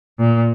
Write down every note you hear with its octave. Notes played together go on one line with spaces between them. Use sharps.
A#2